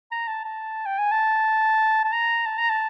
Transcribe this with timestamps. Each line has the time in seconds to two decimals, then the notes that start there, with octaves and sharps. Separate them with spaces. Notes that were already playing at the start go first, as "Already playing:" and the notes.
0.12 A#5
0.28 A5
0.45 A5
0.86 G5
0.99 G#5
1.12 A5
2.05 A5
2.13 A#5
2.46 A5
2.58 A#5
2.70 A5